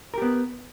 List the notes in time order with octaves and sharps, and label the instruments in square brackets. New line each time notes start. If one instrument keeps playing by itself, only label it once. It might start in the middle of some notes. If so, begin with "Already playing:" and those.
[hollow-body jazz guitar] A#4
G4
B3